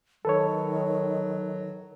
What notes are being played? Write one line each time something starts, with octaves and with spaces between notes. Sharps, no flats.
D#3 F#3 A4 B4 C#5